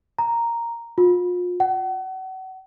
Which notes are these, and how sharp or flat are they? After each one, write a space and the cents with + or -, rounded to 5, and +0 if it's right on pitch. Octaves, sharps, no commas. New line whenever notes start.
A#5 +0
F4 +35
F#5 +35